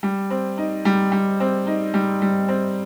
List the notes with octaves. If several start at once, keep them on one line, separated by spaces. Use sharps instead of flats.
G3
C4
D#4
G3
G3
C4
D#4
G3
G3
C4